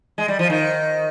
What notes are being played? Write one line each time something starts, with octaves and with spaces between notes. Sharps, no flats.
G#3
G3
F3
D#3